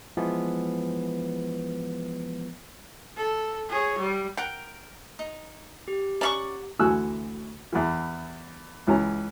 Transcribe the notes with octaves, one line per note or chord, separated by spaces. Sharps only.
E3 F3 G#3 B3
A4
G#4 C#5
G3
A#4 F#5 G5
D#4
G4
C#4 D5 E5 F#5 A#5 C#6 D6
D2 E3 F#4 G#5 E6 F#6
E2 E3
C#2 E3 C#4 A#5